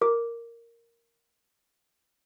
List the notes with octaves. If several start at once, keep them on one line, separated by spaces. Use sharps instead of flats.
A#4 D6